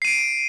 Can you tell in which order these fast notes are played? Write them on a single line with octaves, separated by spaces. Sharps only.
C7 D#7 D7